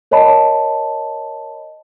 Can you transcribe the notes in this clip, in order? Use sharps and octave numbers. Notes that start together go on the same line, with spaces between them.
A#4 C#5 D#5 A5 B5